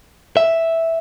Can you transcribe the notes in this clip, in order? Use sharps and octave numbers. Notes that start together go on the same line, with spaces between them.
E5